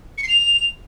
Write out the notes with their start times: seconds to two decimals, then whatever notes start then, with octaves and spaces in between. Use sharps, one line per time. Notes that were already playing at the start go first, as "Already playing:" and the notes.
0.18 C#7
0.23 C7
0.29 F7